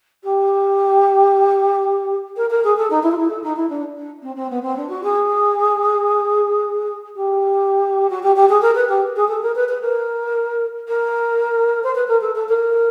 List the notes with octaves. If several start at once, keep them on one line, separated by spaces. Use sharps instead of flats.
G4
A#4
A#4
G#4
A4
D#4
E4
F4
E4
A4
D#4
E4
D4
D4
C4
C4
B3
C4
D4
F#4
G#4
G4
F#4
G4
G4
G#4
A#4
B4
G4
G#4
A4
A#4
B4
B4
A#4
A#4
C5
B4
A#4
A4
A4
A#4